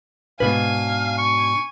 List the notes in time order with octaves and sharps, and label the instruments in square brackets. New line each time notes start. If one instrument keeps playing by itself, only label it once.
[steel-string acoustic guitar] G#2 B2 D4 [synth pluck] B4 [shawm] F5 [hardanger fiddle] G#5
[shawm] C#6